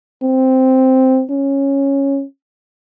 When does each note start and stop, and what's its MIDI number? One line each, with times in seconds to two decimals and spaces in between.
0.23 1.24 60
1.30 2.24 61